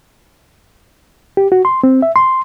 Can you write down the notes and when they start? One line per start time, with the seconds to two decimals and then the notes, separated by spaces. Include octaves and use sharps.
1.37 G4
1.52 F#4
1.65 C6
1.83 C4
2.02 E5
2.16 C6